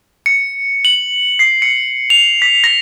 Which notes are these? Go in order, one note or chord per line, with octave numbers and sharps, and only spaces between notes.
C#7
F#7
C7
C#7
F7
B6
A#6